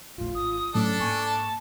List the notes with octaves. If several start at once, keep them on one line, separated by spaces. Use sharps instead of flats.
F1 A#1 A2 F4
G#1 D#6
A2 F#3 A3 C#4 D4 A4
G#2 A#3 G#5 C#6
A5